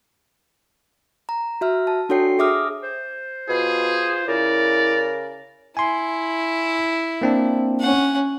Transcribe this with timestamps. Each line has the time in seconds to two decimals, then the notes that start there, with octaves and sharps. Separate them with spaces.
1.29 A#5
1.61 F#4 E5 F6
1.87 A5
2.09 D4 F#4 A4 C#5 G5 C7
2.39 G#4 E5 D6 D#6 F6
2.83 C5
3.49 B2 F4 G#4
4.28 C#3 E4 A#4 D5
5.77 E4 G#5 C6
7.22 A#3 C4 D4
7.80 C#4 F#5